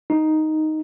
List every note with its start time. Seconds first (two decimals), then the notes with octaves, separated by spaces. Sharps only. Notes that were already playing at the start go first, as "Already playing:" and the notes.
0.10 D#4